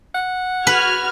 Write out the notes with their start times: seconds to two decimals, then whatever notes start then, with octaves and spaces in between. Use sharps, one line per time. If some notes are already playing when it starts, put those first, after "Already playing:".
0.15 F#5
0.67 F#4 B4 F6 G#6